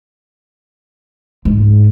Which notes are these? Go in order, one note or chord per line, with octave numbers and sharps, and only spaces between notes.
G#2